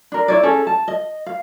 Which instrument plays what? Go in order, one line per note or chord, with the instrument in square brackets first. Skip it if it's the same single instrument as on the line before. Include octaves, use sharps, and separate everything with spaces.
[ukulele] D4 A#4
E4 C#5 D5
C#4 G#4 A4 C#5
A5
D#5
F5